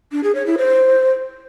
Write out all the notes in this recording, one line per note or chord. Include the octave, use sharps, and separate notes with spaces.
D4
G#4
C#5
E4
C5